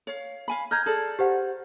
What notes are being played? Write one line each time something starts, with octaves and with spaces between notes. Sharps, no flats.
C#5 F5
F5 G#5 B5
D#5 A#5 F6 G6 G#6
G#4 A4 D5
G4 C5 F#5